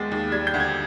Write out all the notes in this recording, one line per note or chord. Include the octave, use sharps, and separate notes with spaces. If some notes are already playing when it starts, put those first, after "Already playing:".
Already playing: D#2 G#3 B3 A6
D#2
G3 G#6
G6
D2
G#6